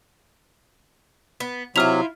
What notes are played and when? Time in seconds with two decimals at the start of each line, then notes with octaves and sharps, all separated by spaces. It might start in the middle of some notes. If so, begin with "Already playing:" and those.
1.40 B3
1.76 C3 F#3 E4 F4 F6 F7